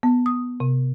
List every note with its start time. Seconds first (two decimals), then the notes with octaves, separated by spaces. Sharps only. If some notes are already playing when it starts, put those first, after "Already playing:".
0.03 B3
0.26 D#6
0.60 C3